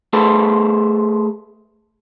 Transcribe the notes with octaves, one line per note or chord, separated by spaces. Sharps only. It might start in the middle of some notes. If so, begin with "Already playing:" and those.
A3 G#4 A4 B4 C5